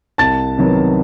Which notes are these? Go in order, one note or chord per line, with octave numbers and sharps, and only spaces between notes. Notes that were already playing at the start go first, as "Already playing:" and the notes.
C2 A5 A6
C3 D#3 F#3 B3